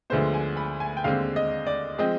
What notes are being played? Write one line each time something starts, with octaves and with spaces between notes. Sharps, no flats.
D2 D3 F3 G#3 B3 C5
G#5
B5
G#5
G5
D#2 D3 G#3 C4 F5
D#5
D5
F3 G#3 C4 D#5